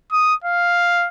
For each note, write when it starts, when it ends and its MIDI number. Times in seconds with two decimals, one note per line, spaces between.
0.12 0.34 87
0.44 1.08 77